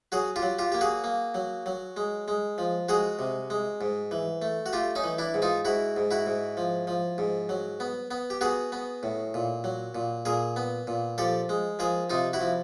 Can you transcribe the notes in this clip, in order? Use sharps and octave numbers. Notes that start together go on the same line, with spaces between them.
F#3 F#4 G#4
F4 G4
F#3
F4 G4
A#3 G4
F#4 G#4
A#3
F#3
F#3
G#3
G#3
F3
G#3 F#4 G#4
C3
G#3
G#2
E3
A3
F#4
A3 F4 G4
C#4 D#4
E3
D4 E4
G#2
D#4 F4
G#2 E4 F#4
G#2
E4 F#4
G#2
F3
F3
G#2
F#3
B3
B3
G4
B3 F#4 G#4
B3
A2
A#2
F#3
A#2
A#2 G#4 A#4
B3
A#2
F3 G4 A4
G#3
F3 G#4 A#4
C3 D#4 F4
E4 F#4
F3